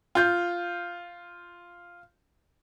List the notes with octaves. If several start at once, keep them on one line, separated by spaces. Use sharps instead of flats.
F4 G6